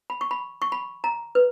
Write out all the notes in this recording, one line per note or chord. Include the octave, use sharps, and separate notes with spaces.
B5
C#6
B5
C#6
B5
A#5
B4